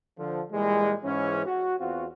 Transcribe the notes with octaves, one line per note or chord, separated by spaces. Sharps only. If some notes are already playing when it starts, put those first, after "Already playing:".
D3 F3
A#2 E3 G3 G#3
G#2 E3 C#4
F#4
E2 C4 F4 F#4